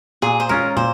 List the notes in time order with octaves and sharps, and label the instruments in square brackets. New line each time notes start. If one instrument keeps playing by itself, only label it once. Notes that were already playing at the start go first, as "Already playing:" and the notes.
[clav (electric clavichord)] A#2 [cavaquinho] G#4
[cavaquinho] C5
[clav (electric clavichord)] G#3 C#4 F4 [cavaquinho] A#4
[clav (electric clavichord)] A#2 [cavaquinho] C5